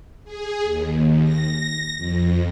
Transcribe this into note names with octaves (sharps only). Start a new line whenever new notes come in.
G#4
D#2
A#6
F2